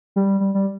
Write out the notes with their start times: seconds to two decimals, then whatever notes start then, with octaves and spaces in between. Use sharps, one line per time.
0.16 G3
0.40 G3
0.54 G3